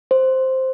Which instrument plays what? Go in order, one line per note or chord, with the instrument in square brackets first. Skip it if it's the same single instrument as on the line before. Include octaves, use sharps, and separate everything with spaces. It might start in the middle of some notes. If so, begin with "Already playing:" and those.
[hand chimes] C5